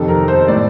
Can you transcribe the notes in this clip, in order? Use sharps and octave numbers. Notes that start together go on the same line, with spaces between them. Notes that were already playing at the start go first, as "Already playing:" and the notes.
Already playing: F2 C3 D#3 A4
A#4
C5
A2 D5